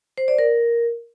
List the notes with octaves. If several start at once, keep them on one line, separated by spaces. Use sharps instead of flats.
C5
D5
A#4